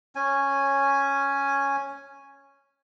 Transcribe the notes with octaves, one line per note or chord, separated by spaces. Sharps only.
C#4 G#5